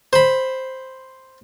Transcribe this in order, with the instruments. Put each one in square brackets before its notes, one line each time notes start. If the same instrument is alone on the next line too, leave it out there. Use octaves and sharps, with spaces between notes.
[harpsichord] C5 B5